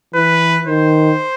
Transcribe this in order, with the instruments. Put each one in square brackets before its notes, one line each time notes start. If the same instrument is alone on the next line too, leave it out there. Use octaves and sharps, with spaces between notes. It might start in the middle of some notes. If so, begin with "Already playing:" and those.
[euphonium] E3 [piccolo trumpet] B4
[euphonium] D#3 [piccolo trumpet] C5